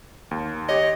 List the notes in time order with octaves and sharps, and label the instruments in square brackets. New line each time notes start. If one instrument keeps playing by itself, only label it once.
[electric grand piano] D#2
[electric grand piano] G4 C#5 [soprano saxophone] D#5